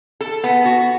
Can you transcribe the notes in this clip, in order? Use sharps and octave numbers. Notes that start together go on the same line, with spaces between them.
A4
B3
F#4